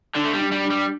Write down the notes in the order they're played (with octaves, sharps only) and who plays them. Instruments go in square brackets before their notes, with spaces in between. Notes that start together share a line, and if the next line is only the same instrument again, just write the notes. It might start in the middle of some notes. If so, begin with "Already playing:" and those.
[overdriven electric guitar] D3 [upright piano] D4
[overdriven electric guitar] A3
G3
[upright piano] D4
[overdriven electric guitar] G3
[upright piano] D4
[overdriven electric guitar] G3